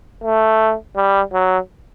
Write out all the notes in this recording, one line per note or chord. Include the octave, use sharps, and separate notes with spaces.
A3
G3
F#3